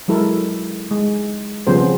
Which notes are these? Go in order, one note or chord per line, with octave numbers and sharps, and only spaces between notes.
F#3 G#3 E4 A4 A#4
G#3
C#3 F3 G3 B3 C#4 C5
C4